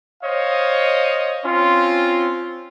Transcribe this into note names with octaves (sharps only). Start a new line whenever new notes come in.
C5 C#5 D#5 F5
C4 C#4 F4